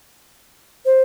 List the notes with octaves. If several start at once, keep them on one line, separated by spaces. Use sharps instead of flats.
C5